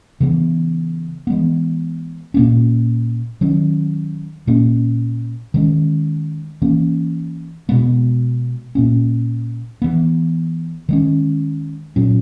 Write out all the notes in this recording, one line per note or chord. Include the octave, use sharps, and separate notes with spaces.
C#3 E3 B3
E3 G#3 B3
A#2 A#3 C#4
D#3 F#3 C#4
A#2 A#3 C#4
D#3 G#3 C#4
E3 A#3 C#4
B2 G#3 B3
A#2 A#3 C#4
E3 B3
D#3 G#3 C#4
A#2 F#3 C#4